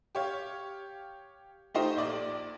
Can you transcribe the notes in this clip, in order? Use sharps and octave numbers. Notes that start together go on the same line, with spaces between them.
G4 C#5 F5
A3 D#4 F4 G4 C5 D#5
A#1 D5